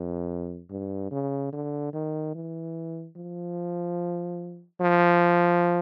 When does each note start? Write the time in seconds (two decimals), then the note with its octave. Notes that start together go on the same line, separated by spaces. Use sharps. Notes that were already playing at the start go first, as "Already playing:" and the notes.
Already playing: F2
0.71 G2
1.11 C#3
1.53 D3
1.94 D#3
2.35 E3
3.16 F3
4.81 F3